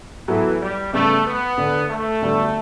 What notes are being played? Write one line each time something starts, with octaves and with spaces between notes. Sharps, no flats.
A2 E3 F#3 B3 F#4 A4
G3
C#3 G3 A3 B3
B3
D3 A3 D4
A3
D3 G3 B3 D4 F#4